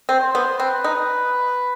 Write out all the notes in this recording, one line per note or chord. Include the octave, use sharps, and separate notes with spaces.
C4
C5
B3
C4 B4
D#4